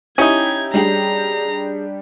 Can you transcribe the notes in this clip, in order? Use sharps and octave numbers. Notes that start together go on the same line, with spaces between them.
C#4 D#4 E4 G4 G#6
G3 D4 G4 G#4 A#5